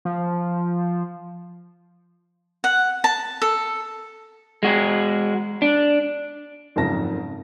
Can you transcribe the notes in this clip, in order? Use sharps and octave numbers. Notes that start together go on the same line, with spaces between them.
F3
F#5
A5
A4
G#3 F#4
D4
F#1 F2 G#2 A#4 A5 A#6